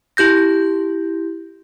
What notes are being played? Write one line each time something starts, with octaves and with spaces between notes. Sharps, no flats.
E4 G4 G6 A#6